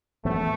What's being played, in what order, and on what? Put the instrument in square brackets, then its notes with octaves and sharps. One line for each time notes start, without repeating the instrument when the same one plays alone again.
[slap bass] A2 E3 B3 [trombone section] A3